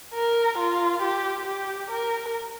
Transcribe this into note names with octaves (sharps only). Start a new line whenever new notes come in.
A#4
F4
G4
G4
A#4